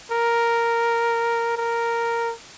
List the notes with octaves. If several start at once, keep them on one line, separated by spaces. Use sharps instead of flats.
A#4
A#4